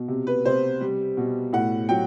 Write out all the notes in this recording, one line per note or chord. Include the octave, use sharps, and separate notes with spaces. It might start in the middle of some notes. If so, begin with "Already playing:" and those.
Already playing: B2
C3
B4
C3 C5
G3
B2
A2 F#5
F#3 G5